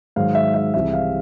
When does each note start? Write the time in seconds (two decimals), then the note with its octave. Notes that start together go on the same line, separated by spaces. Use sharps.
0.16 G#2 D#3 F#3 F5
0.35 E5
0.54 E5
0.74 C2 C3 E3 G#3 E5
0.93 F5